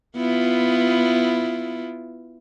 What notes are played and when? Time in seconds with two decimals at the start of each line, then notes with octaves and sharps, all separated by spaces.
0.16 B3 E4 F4